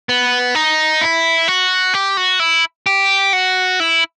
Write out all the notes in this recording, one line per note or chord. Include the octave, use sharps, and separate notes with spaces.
B3
D#4
E4
F#4
G4
F#4
E4
G4
F#4
E4